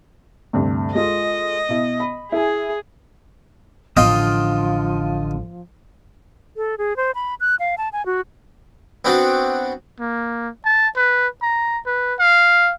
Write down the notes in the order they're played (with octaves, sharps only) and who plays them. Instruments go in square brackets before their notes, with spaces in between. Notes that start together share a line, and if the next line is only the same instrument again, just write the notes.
[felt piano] D2 G2 C3
[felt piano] G#3 F4 A4 [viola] D#5
[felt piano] B2 E4
B5
[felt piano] E4 G#5 [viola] G#4
[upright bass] A1 [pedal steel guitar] D3 D#6 [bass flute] F3 [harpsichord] F4 D#5 G5
[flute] A4
G#4
C5
B5
F#6
F5
A5
G#5
F#4
[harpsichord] B3 C4 D4 F#4 D6
[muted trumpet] A#3
A5
B4
A#5
B4
F5